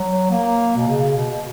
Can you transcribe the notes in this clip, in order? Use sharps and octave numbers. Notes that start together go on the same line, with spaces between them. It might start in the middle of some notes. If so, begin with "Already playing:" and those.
Already playing: F#3
A#3
B2
C#3
B2
B2